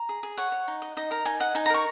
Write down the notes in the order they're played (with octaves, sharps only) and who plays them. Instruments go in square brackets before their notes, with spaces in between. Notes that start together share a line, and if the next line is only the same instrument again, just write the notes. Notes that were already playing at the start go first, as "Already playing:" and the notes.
Already playing: [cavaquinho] A#5
G#4
G#4
C#5 F#5
C#5
D#4
D#5
D#4 D#5
A#4 A#5
D#4 G#5
D#5 F#5
D#4 G#5
A#5
A#4 C#6